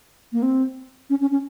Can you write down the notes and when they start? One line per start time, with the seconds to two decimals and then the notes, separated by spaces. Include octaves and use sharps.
0.33 A#3
0.43 C4
1.10 C#4
1.21 C#4
1.31 C#4